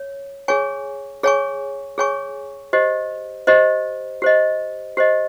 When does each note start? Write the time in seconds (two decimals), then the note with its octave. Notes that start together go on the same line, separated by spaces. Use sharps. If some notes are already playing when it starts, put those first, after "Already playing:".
Already playing: C#5
0.48 G#4 C#5 G#5 C#6
1.23 G#4 C#5 G#5 C#6
1.98 G#4 C#5 G#5 C#6
2.73 G4 C5 D#5
3.47 G4 C5 D#5
4.22 G4 C5 D#5
4.97 G4 C5 D#5